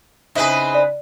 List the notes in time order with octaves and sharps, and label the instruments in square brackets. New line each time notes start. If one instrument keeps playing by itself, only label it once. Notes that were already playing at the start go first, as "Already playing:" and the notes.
[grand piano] C#3 D#4 [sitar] C4 B4 [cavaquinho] E4 G#4
[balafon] D5